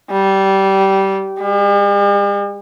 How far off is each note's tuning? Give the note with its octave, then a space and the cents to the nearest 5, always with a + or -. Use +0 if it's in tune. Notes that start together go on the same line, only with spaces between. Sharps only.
G3 -20
G3 +45